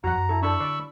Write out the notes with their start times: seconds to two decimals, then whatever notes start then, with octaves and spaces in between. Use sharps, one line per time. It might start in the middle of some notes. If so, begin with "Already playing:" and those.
0.04 F2 E3 F3 F#4 F#5 A#5
0.15 F#2
0.29 E4 A4
0.43 D4 A4 B5 C#6 E6
0.60 D3 D5